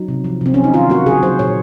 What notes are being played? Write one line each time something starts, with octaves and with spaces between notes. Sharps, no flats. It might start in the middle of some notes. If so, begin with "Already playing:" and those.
Already playing: F#3 D#4
C3
F3
C3 C4
F#3 C#4
D#4
D#3 F4
A#3 F#4
C#3 G#4
F#3 C5
A#2 C#5